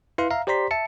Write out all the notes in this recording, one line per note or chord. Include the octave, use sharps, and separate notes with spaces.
E4 B4 F5 C6
E5 F5 A#5
G4 C5 D5 A#5 C6 B6
E5 A5 C#7